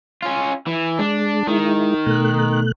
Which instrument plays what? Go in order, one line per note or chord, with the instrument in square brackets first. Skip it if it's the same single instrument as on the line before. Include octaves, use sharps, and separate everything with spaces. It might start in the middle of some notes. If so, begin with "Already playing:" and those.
[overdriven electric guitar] C#4 F4
E3
[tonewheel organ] G#3 [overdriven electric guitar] D4
[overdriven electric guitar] D#3 [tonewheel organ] G#3 E4
[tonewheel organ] B2 A3 F#6